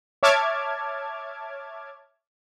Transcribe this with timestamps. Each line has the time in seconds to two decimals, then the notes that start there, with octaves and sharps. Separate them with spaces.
0.23 C#5 E5 A5 D6 F6 G#6